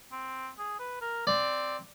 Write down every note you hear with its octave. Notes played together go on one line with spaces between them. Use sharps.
C4
G#4
B4
A#4
C4 D5